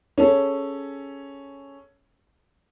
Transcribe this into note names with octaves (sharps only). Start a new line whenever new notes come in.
C#4 G#4 A4 C#5